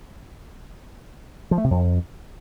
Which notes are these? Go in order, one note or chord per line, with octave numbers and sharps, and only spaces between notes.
F3
A3
C3
F2